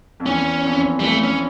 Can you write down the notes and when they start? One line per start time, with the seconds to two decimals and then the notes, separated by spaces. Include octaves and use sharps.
0.20 F2
0.26 E2 C#4
0.65 F2
1.00 G3
1.04 F2 A3
1.24 C#4